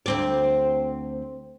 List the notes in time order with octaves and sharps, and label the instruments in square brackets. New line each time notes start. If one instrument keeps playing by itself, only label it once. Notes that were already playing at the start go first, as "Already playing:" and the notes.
[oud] D2 C4 D5